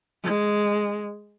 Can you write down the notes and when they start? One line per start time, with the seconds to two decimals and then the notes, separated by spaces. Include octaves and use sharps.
0.24 G#3